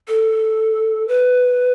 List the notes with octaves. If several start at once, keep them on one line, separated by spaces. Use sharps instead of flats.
A4
B4